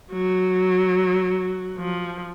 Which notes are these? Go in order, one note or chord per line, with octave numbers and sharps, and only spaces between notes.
F#3
F3